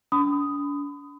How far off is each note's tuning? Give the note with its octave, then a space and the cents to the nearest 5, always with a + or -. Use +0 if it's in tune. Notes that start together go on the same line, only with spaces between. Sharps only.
D4 -40 B5 +35 D#6 +0